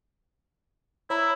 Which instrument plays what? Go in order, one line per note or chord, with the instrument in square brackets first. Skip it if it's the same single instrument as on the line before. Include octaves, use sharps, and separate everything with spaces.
[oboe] E4 [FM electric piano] C#5 A#5